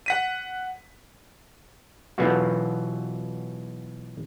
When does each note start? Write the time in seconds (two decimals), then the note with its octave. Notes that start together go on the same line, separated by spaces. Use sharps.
0.06 F#5 B6 D#7
2.18 B2 E3 F#3 B3 F4 F#4